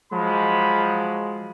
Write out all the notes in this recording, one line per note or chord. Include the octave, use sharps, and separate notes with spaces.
F3 F#3 G#3 B5